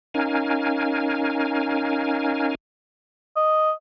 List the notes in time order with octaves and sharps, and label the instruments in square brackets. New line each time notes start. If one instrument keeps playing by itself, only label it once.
[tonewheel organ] C#4 D#4 A#4 F5 G#5
[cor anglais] D#5